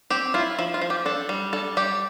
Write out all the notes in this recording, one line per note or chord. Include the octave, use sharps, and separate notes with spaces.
C4 G4
E4 F4
F3 E4
F4
F3
G4
D4 A4
G3
D4 A4
G3 G4